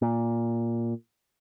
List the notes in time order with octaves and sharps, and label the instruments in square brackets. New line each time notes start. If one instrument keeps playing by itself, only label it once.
[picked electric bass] A#2